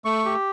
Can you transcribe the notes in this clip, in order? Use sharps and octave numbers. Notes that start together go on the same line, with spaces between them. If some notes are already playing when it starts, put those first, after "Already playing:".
A3 C#6
G4